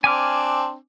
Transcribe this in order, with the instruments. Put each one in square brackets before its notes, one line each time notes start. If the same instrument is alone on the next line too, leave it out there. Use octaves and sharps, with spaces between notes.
[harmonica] C4 D4 [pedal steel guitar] G#5 D6 F6